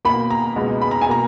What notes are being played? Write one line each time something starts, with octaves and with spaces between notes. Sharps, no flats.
B2 A#3 B5
A#5
C#2 B2 G#3 B3
B5
A#5
G#5
B2 A#3 A#5